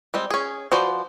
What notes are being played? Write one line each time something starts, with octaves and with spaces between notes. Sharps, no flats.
G3 G#3 C4
C#4 G#4
F3 F#4 B4 C5 D5